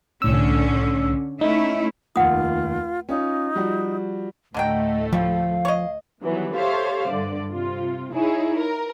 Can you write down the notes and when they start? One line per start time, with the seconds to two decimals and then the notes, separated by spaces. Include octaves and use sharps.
0.22 C2 A2 D3 C#4 E6
1.41 A3 C#4 D#4 E4
2.16 F1 D#2 F4 F#5 D#6
3.09 C#4 D#4 F4
3.55 F3 G3 F#4
4.54 D2 A2 D3 F#3 A3 D#5 G5
5.13 F3 G3 F5
5.65 C#5 D#5
6.22 D#3 E3 F#3 G3 B3
6.54 G4 A4 C5 C#5 E5 F5
7.09 G2 D3 D5
7.51 C3 F4
8.13 D#4 E4 G#4 C#5
8.57 A#4